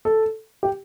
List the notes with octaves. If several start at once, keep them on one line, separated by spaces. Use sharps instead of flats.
A4
G4